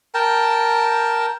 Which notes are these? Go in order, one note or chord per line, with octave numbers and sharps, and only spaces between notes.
A#4 G5 A5